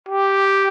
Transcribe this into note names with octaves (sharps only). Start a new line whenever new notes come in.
G4